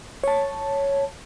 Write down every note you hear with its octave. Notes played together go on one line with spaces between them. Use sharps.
C#5 A5